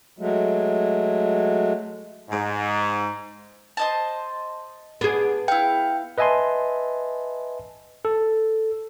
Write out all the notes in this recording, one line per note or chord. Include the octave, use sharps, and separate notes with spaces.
F#3 G#3 A3
G#2
C5 D#5 A5
B3 D4 G#4
E4 F5 G5
B4 D#5 E5 G#5 A5 C6
A4